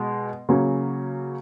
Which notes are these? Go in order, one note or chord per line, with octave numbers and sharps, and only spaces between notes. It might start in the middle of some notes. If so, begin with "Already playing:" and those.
Already playing: B2 G#3
C#3 F#3 A#3 C#4